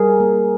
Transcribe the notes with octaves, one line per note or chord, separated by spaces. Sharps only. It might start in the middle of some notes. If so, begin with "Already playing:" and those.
Already playing: G3 G#4 A#4
A#3